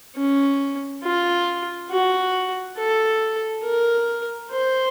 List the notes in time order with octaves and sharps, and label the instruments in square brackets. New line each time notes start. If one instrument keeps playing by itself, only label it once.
[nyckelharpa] C#4
F4
F#4
A4
A#4
C5